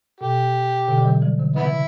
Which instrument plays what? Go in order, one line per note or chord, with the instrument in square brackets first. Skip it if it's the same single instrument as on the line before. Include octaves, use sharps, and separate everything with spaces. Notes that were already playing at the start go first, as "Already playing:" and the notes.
[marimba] B2 [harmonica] G4
[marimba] B2 D3
E3
D3 F#3
E3 G3
D3 F#3
[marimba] C#3 E3 [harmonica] B3 E4
[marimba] C#3